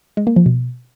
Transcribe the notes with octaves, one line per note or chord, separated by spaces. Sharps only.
G#3
A#3
F3
B2